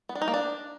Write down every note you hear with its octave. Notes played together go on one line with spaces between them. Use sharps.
B3
D4
D#4
A#3
D4